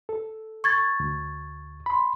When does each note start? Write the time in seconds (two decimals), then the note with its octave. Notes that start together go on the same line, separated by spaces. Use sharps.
0.09 A4
0.64 C#6 G#6 A6
1.00 D2
1.86 B5 C6